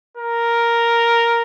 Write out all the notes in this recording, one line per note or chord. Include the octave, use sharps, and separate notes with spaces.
A#4